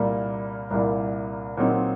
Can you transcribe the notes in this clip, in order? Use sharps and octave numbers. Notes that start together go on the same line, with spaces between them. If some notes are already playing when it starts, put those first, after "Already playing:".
Already playing: C2 A#2 G3 A#3
C2 A#2 G3 A#3
A#2 F#3 C4 D#4